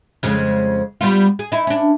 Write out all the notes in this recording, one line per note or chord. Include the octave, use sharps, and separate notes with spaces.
F2 C#3 G#3
G3 B3 F4
G#4
D#4 E4
C#4 D4